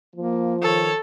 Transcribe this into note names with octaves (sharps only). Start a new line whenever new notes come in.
F3 A#3
D#3 A4 C#5